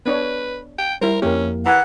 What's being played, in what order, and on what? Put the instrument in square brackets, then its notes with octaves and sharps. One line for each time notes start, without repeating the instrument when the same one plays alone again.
[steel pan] B3 D4 C#5 [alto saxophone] B4
[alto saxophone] G5
[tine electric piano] G3 [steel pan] E4 C5 [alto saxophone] A#4
[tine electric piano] F2 F3 A#3 [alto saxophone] C#4 [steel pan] G4 A#4
[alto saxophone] E3 [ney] F#5 [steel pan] G#5 A#5